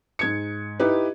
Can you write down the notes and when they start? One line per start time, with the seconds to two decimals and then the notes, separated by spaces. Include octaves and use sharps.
0.19 G#2 G#6 C#7
0.80 D#4 E4 G4 B4